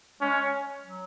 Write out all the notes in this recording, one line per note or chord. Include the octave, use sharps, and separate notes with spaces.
G#3 C#4
F#3